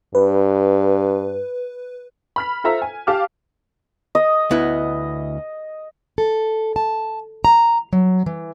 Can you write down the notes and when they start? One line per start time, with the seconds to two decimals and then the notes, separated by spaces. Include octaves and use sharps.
0.15 G2 B4
2.36 B5 F6 B6
2.64 F4 A4 C5 E5 A#5
2.82 G#5
3.07 G4 F5 A5 D6 F6
4.15 D#5
4.51 D2 B3 E4
6.18 A4
6.76 A5
7.45 A#5
7.93 F#3
8.26 E3